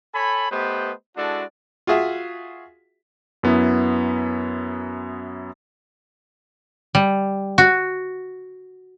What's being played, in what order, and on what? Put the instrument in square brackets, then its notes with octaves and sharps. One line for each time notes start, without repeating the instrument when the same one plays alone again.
[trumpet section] A4 C#5 G#5 B5
A3 B3 G4 B4 C5 D#5
G#3 D4 E4 F#4 A4 D5
[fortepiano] F4 F#4 G#4 E5
[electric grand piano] F#2 B3 E4
[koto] G3
F#4